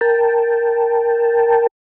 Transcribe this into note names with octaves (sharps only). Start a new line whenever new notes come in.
A#4 G5 A5